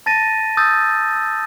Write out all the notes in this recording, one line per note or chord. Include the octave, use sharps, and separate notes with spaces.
A5 A6 A#6 D#7
D#6 E6 G6 A6
E6